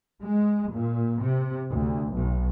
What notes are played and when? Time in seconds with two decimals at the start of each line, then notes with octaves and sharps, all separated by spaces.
0.22 G#3
0.73 A#2
1.21 C3
1.72 D2
2.15 B1